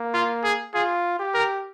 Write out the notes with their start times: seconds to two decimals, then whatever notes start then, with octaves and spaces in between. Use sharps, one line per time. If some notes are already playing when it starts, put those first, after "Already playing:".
Already playing: A#3
0.14 F4
0.44 G#4
0.74 F4 G#4
1.19 G4
1.34 A#4